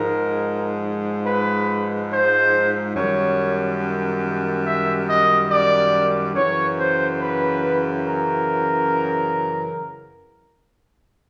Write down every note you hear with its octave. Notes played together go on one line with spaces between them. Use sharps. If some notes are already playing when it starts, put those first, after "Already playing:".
Already playing: G#2 F3 G#3 A#4
B4
C5
F#2 D#3 G3 C#5
E5
D#5
D5
F#2 C#3 E3 C#5
C5
B4
A#4